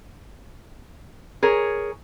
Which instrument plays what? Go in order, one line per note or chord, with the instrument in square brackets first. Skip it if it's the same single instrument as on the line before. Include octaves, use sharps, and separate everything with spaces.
[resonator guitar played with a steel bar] G#4 A#4 C#5